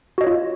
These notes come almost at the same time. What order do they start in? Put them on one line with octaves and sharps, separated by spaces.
F#4 D#5 C#5 F4